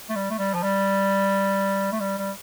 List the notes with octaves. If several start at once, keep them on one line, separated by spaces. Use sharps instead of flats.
A3
G3
A3
G3
F3
G3
A3
G3
G3